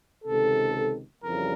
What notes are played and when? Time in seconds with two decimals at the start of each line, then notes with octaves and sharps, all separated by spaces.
0.25 C#2 C3 D#3 A4
1.23 F2 C#3 E3 G3 A#4